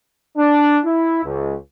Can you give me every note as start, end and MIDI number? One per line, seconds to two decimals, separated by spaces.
0.37 0.79 62
0.85 1.23 64
1.24 1.55 37